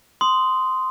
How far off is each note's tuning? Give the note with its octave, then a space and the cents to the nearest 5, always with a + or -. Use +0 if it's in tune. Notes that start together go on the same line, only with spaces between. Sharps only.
C6 -10 D#6 +0